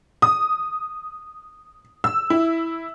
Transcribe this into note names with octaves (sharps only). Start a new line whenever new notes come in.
D#6
E6
E4